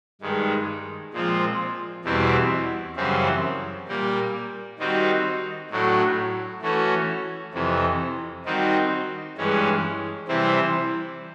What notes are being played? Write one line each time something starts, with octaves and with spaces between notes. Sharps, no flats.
G2 D#3 G#3
A#2 F3 G#3 C4 F4
E2 B2 G3 C4 E4
F#2 C#3 E3 G3 C4
A#2 G3 A#3
D#3 G3 C4 D#4 F#4
A2 F#3 A3 D4
E3 A3 C#4 F#4
F2 C3 E3
D#3 G3 C4 D#4 F#4
G2 E3 G#3 C#4
C3 E3 G3 C4 E4